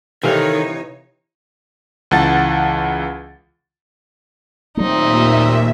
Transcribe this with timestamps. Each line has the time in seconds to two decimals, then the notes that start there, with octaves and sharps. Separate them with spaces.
0.23 C3 D#3 E3 D#4 A4 C#5 F5
2.11 C#2 E3 F#5 A5 A6
4.77 D#2 A#2 F#3 A3 C4 D#4 E5